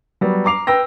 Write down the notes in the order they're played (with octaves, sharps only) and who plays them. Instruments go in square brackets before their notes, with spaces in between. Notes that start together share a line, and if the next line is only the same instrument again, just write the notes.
[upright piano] F#3 G3 B3
A#5 D6 C7 F7
B4 G5 E6 A#6